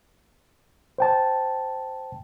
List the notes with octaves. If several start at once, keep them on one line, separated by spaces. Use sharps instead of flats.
C5 G5 A5